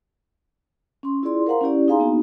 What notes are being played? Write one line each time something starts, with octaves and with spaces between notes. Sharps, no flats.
C#4 C6
E4 F4 G#4 D5 C6
A#4 C5 F5 F#5 A#5 C6
C#4 E4 G4 D5
D#4 G#4 F5 G#5 A#5 C6
A#3 B3 D4 D#4 F#4